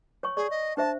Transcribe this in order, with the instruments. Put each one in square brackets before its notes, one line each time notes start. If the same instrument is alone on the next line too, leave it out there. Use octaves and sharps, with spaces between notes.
[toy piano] C#5 G#5 C#6
[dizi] G#4 [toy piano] D5 C#6
[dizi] D#5
[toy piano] D4 C5 E5 [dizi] A5